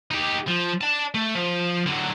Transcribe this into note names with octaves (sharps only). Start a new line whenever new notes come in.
D#4 G4
F3
D5 A5
A3
F3
D3 F#3